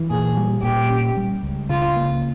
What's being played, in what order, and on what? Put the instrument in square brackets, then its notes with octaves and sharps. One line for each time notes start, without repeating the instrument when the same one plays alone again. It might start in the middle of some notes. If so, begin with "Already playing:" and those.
Already playing: [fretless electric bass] E3
[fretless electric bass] A#2 [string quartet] G#4
[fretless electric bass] G3
[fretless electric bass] A#2 [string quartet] G4
[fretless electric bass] C#4
G3
C#2
[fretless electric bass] C#3 [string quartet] F4
[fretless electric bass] A#3